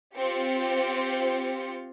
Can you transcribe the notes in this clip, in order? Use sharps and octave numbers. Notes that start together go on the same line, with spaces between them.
C4 F4 G4 C5 C#7